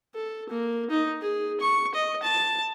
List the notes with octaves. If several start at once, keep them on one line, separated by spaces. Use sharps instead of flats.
A4
A#3
D#4
G#4
C#6
D#5
A5